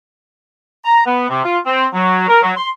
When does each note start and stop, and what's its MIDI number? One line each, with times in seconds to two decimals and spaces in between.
0.85 1.02 82
1.06 1.29 59
1.29 1.43 48
1.44 1.58 65
1.66 1.86 60
1.93 2.27 54
2.28 2.39 70
2.42 2.52 54
2.57 2.69 84